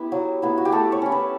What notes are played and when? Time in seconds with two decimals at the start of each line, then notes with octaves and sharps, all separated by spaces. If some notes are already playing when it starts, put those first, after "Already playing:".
Already playing: B3 E4 G4
0.12 F#3
0.42 B3 E4
0.58 F#4
0.65 G4
0.72 A3 A4
0.92 C#5
1.02 C#4 E4
1.12 B4